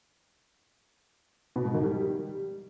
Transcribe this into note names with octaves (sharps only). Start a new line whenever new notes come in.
B2
G#2
D#3
G3